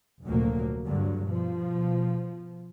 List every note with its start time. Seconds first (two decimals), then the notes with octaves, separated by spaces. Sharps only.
0.24 F1 D2 A#2 F#3 A#3
0.84 G2 D3 F#3
1.25 B2 F3